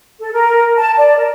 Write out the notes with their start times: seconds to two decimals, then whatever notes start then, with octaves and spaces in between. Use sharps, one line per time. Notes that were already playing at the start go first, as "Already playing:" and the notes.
0.20 A4
0.32 A#4
0.77 A5
0.97 D5
1.18 A#4